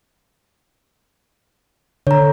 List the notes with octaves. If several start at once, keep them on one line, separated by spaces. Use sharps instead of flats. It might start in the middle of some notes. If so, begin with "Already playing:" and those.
D3 C#5 A#5